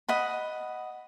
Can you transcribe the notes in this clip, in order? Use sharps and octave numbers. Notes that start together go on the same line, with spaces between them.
D#5 F#5 B5